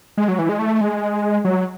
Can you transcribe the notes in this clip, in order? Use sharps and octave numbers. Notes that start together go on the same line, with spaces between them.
G#3
F#3
E3
G#3
A3
G#3
F#3